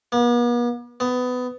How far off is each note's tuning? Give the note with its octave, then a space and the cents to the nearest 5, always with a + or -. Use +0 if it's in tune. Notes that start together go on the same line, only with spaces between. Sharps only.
B3 -45
B3 +20